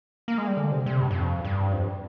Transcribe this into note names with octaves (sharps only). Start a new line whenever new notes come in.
A#3
G#3
G3
D3
C3
C3
G2
G2
F2
G2
F2
G2